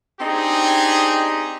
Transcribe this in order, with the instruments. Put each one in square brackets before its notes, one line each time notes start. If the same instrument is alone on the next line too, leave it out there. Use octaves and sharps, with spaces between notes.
[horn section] C4 D4 D#4 G4 G#4